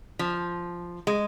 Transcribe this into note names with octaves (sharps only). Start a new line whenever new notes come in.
F3
G#3